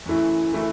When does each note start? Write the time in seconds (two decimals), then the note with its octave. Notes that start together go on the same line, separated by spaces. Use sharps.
0.06 F#2 E3 A3 E4
0.53 E3 A3 E4